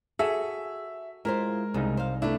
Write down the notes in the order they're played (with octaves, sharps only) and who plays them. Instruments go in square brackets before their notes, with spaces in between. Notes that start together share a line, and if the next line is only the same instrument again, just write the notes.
[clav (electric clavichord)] F#4 A4 [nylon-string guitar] G#4 [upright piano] E5
[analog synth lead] G#3 [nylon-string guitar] E4 F4 C5 [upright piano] A#4
[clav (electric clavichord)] C2 D#4 [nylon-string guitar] C#3
[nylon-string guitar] C5 F5
[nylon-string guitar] A3 B3 D4 [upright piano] E4